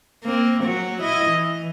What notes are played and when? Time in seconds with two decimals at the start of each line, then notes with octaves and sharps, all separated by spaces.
0.24 A#3 C4
0.64 F#3 F#4
1.01 E4 D#5
1.30 E3